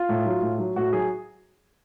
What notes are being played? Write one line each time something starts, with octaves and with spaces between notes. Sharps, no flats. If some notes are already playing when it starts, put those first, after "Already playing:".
Already playing: F4
A2
F#3
A2
F#3
A2 F#4
F#3 G#4